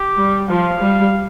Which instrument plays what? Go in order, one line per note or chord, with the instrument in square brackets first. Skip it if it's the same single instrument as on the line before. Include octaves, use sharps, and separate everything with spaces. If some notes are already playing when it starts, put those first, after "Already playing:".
Already playing: [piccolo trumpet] G4
[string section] G3
[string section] F3 [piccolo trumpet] F5
[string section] G3